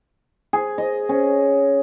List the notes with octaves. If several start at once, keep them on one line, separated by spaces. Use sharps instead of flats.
G#4
D#5
C#4